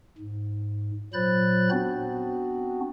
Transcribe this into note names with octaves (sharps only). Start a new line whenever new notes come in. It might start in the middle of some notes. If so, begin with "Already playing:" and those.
G#2
A#2 F#3 C5 B5 F#6 A6
B3 C4 D4 F#4